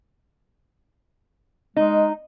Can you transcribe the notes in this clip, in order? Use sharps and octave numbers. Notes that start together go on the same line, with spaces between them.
G#3 D#4